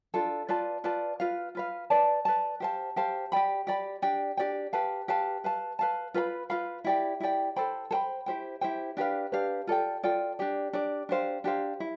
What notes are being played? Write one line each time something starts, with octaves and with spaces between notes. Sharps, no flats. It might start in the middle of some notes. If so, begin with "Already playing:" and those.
D4 F4 A4
F4 B4 D5 A5
F4 B4 D5 A5
F4 B4 F5
F4 B4 F5
B4 D5 A5
B4 D5 A5
G4 C5 F5 A5
G4 C5 F5 A5
G4 D5 G5 B5
G4 D5 G5 B5
D4 G4 D5 G5
D4 G4 D5 G5
G4 B4 F5 A5
G4 B4 F5 A5
B4 F5 A5
B4 F5 A5
F4 B4 F5 B5
F4 B4 F5 B5
E4 G4 D5 G5
E4 G4 D5 G5
A4 C5 G5 B5
A4 C5 G5 B5
E4 G4 C5 G5
E4 G4 C5 G5
D4 G4 B4 F5
D4 G4 B4 F5
F4 A4 D5 G5
F4 A4 D5 G5
D4 G4 D5
D4 G4 D5
D4 G4 C5 F5
D4 G4 C5 F5
E4